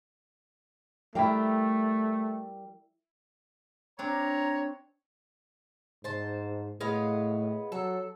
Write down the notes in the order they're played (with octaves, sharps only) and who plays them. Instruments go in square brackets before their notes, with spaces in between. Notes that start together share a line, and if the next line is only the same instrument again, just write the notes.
[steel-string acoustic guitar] G3 A#4 G5 [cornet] A3 [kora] E4 D5 F5
[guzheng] C4 D4 [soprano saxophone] C#5 [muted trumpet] A#5
[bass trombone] G#2 [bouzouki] C5 A5
[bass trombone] A2 [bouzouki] G#3 B3 F5
[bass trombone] F#3 [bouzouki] A4